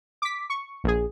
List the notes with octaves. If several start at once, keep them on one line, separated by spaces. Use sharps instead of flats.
D6 B6
C#6
A#1 G#4